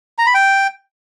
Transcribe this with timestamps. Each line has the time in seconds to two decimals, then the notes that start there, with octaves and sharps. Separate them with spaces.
0.18 A#5
0.26 B5
0.34 G5